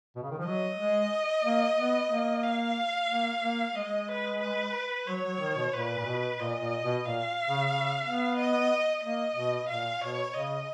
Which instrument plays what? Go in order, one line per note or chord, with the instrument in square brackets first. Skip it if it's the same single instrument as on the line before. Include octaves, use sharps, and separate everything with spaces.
[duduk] B2
C#3
D#3
F3
[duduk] F#3 [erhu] D#5
[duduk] G#3
A#3
B3
A#3
[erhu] F5
[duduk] A#3
A#3
[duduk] G#3 [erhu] D#5
[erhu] B4
B4
[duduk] F#3 [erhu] C#5
[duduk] F#3
D#3
B2
[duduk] A#2 [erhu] B4
[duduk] A#2
B2
[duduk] A#2 [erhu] D#5
[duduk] A#2
B2
[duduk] A#2 [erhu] F5
[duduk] C#3
C#3
B3
[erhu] D#5
[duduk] A#3 [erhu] D#5
[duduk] B2
[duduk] A#2 [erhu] F5
[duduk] B2 [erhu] C#5
[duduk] C#3 [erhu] D#5